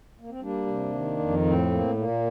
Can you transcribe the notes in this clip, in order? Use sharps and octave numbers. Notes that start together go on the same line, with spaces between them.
A#3
C4
G3 A#3 D4
C3
D#3
F2
A2 C4
A#3
A#2 A#3